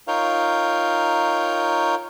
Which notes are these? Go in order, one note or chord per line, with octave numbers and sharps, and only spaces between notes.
D#4 F4 A#4 C#5 F5 G5